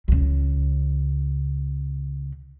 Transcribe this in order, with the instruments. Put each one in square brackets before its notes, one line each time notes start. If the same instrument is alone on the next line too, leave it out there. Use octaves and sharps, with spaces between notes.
[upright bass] C#2 C#3